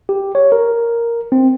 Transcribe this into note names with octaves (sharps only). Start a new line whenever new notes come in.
G4
C#5
A#4
C4